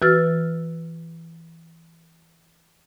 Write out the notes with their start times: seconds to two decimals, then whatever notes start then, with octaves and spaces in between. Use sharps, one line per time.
0.02 E3 F#4 B4 E6 F6 A6